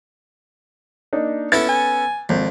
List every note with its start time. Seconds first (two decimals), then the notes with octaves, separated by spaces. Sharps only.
1.13 A#3 D4 D#4
1.52 B3 C#4 E4 A4 A6
1.69 G#5
2.29 G#1 F2